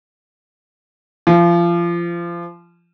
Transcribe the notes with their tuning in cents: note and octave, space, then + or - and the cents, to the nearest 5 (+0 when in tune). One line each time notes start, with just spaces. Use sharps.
F3 -25